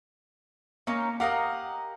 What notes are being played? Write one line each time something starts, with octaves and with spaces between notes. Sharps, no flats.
A#3 C#4 D#4
G4 A#4 D#5 F5 F#5